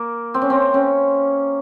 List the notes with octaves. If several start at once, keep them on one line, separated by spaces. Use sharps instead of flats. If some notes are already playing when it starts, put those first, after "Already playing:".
Already playing: A#3
C4
C#4
C4
C#4